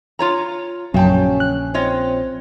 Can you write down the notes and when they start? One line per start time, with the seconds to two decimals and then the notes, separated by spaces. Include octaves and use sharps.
0.19 F4 C#5 A#5
0.94 A#1 F#2 C#3 C#4 G5 A5
1.40 F#6
1.74 C4 F4 C#5 D#5